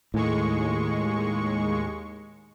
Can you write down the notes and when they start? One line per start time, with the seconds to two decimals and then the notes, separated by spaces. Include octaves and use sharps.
0.14 D#2 A2 G#3 C#6